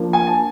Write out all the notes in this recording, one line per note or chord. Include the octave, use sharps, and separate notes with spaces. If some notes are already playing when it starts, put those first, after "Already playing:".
Already playing: F3 A#3 D4
G#5
A5